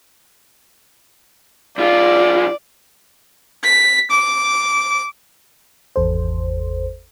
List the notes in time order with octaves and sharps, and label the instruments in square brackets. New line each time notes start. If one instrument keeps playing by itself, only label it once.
[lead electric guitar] B1 F4 [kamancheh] D5
[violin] B6
D6
[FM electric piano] G#1 E2 A4 C5